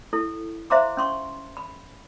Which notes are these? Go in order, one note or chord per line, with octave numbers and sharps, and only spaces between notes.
E4 A4
C5 E5 F5 A#5 C6 D6
C#4 C6 C#6
B5